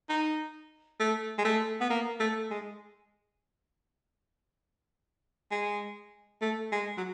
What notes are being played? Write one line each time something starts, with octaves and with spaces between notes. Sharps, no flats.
D#4
A3
G#3
A3
B3
A#3
A3
G#3
G#3
A3
G#3
F#3